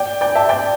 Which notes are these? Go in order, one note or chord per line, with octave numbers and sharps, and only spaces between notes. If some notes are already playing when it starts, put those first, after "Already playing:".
Already playing: D5 G5
D5 G5
E5 A5
D5 G5